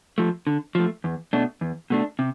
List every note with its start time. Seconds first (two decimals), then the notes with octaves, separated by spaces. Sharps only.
0.18 F3 A3
0.47 D3
0.75 F3 A3
1.04 E2
1.33 B2 A3 D4
1.61 E2
1.90 B2 A3 D4
2.19 C3